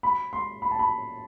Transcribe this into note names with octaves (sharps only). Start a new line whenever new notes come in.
B5
C6
B5
A5
B5